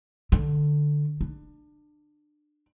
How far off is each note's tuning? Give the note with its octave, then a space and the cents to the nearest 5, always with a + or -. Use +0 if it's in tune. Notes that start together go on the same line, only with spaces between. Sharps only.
D3 +10
D4 +25